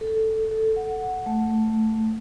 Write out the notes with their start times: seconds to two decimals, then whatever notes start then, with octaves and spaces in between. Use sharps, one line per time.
0.01 A4
0.51 A4
0.76 F#5
1.26 A3